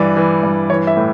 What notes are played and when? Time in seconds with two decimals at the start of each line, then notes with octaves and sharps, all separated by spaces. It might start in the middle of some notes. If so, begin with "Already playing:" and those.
Already playing: G2 E3 D5
0.17 E3
0.43 G2
0.70 E3 C#5
0.87 E5
0.97 A2